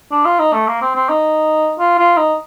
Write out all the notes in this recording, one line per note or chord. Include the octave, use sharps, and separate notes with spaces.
D4
F4
D#4
A3
A#3
C4
C4
D#4
F4
F4
D#4